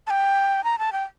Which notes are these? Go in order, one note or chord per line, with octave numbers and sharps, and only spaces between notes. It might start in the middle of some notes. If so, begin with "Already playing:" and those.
A5
G5
A#5
A5
G5